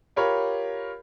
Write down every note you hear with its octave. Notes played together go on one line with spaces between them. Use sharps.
F4 G4 A#4 C#5 B5